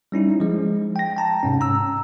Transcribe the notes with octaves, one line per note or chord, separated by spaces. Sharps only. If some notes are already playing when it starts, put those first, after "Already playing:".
G3 C#4 D#4 E4
F3 G#3
G5 A#6
G5 A5 A#5
G#2 C3 C#4
A#5 E6